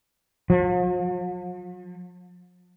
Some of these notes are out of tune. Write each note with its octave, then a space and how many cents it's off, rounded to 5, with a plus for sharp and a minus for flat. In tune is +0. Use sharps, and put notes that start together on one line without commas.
F3 +45